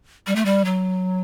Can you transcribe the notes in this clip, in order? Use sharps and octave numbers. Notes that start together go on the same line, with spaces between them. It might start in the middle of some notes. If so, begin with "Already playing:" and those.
G3
A3
G3
F#3